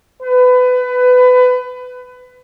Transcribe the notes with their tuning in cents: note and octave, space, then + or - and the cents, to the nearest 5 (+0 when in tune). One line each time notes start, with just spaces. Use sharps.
B4 +25